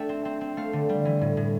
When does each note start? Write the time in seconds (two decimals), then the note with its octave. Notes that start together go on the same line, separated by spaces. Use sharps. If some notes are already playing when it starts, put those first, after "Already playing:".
Already playing: A3 D4 E5 G5 A5
0.09 C4
0.25 C4
0.41 C4
0.57 A3 F5
0.73 D3
0.89 G3
1.05 E3
1.21 A2
1.37 A2